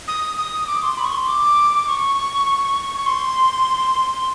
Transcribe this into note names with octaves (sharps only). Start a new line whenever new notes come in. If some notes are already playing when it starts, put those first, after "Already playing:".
D#6
D#6
D6
C6
B5
C#6
C6
D6
C#6
C#6
C6